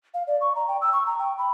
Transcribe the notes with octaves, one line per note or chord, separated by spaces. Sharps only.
F5
D5
C#6
A#5
G5
E6
C#6
A#5
G5
B5